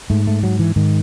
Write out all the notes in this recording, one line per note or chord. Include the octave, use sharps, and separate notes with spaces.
G#2 A3
A3
F#3
E3
G#2 D#3